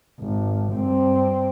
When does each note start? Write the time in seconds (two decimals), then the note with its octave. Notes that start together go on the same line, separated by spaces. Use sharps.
0.20 G#1
0.74 G2 C4